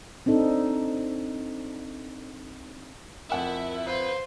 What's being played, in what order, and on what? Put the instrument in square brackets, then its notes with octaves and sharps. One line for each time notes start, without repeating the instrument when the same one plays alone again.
[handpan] C4 D4 D#4 A4
[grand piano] F2 F#5 E7 [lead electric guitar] E4 [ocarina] A#4
[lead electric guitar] B4 [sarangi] C5 [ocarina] F5